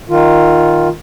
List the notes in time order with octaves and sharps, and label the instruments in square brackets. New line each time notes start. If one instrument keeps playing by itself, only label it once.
[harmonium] D#3 F4